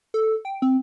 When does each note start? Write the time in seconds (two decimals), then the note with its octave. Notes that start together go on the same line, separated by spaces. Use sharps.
0.14 A4
0.45 G5
0.62 C4